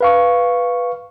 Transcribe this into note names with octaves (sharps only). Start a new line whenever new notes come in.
B4 F5 C#6